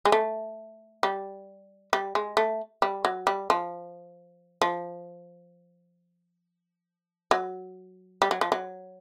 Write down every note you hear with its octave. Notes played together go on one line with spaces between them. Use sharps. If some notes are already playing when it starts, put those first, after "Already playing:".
G#3
A3
G3
G3
G#3
A3
G3
F#3
G3
F3
F3
F#3
G3
F#3
F3
F#3